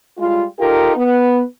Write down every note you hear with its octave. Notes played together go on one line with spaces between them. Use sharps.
G3 G#3 F4
D#4 F4 G4 A4 A#4
B3